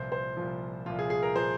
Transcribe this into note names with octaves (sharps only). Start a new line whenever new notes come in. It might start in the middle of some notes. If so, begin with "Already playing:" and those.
Already playing: C2 A#2 F3 C5
C5
C2 A#2 F3
C2 A#2 F3 F4
G#4
G#4
A#4
A#2 F3 C5